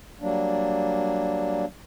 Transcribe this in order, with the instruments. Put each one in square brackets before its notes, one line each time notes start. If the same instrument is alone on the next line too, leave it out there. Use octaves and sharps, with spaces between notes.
[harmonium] F#3 G3 A#3 D4